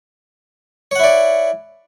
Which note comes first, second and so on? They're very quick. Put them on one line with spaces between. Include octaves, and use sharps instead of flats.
C#5 F#5 E4 D5